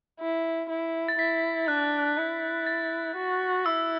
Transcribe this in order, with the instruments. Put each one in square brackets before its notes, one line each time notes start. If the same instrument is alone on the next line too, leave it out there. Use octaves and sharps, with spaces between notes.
[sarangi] E4
E4
[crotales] A6
[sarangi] E4 [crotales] B6
[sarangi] D4 [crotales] F#6
[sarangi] E4
[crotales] A6
[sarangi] F#4
[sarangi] E4 [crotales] E6